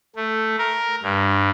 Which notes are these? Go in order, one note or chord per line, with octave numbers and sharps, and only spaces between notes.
A3
A#4
G2